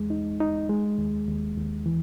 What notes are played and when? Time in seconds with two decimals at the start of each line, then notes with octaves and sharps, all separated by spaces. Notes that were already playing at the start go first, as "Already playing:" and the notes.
Already playing: E2 G#3
0.10 D#4
0.40 D#4
0.69 G#3
0.98 D#2
1.27 D#2
1.57 D#2
1.86 E3